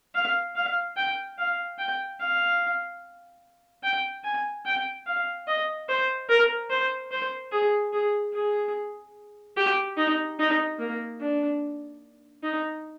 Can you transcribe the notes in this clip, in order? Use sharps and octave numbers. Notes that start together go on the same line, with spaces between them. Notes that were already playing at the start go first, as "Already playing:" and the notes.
F5
F5
G5
F5
G5
F5
G5
G#5
G5
F5
D#5
C5
A#4
C5
C5
G#4
G#4
G#4
G4
D#4
D#4
A#3
D4
D#4